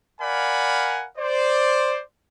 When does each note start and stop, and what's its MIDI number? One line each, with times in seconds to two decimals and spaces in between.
0.21 1.07 70
0.21 1.07 74
0.21 1.07 77
0.21 1.07 78
0.21 1.07 80
0.21 1.07 83
1.18 2.02 72
1.18 2.02 74